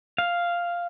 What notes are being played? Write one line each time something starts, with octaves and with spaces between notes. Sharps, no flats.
F5